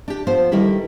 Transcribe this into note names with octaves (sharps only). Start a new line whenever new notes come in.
D4 G4
F3 B3 C5
D3 D#3 G3 E4 G4 B4